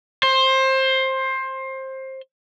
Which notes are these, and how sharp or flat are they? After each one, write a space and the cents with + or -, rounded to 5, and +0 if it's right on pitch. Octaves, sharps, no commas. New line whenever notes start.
C5 +20